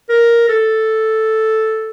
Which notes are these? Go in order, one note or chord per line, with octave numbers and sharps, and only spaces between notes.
A#4
A4